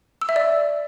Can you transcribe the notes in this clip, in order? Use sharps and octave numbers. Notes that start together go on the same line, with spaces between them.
E6
E5
D5